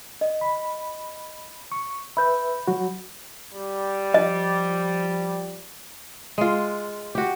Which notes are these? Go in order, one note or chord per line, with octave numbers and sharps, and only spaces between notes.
D#5
B5
C#6
B4 E5 B5 G6
F#3 F#4
G3
F3 D#5
G#3 F4
F#4 G4